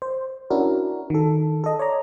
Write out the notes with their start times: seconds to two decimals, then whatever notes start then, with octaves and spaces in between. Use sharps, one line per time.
0.02 C5
0.50 C#4 D4 E4 F#4 A#4
1.10 D#3 A4
1.64 A4 D#5
1.79 C#5 D5 A#5